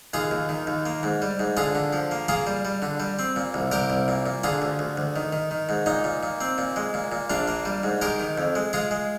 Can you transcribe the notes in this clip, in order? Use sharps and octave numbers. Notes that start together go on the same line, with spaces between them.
D#2 F4 G#4
D#2
D#3
D#2
A#3
G#2
G3
G#2
D3 F4 G#4
D3
F3
A#3
A#3 F4 G#4
G3
G3
D3
G3
C4
A#2
C2
C2 G4 A#4
C2
A#2
A#2
D3 F4 G#4
D2
D2
D2
D#3
D#3
D#3
G#2
A#2 D#4
A#2
A#2
C4
A#2
G#3
A#2
A#2
A#1 D4 F4
A#3
G3
G#2
G#3 G4 A#4
D#3
F2
G#3
G#3 F4 G#4
G#3